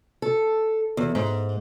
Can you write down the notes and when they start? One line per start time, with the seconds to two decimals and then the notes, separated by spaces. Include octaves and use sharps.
0.22 A4
0.97 E2
1.15 G#2